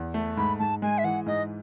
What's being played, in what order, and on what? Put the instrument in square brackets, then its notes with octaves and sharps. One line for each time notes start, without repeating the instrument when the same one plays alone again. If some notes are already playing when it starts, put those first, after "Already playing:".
Already playing: [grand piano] E2
A3
[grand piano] G#2 [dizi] B5
[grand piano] G#2 [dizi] A5
[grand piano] G#3 [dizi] G#5
[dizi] E5
[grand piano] E3 [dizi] F#5
[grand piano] G#2 [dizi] D#5